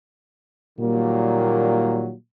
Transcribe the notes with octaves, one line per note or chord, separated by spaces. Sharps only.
A#2 D#3 F#3 G3 A#3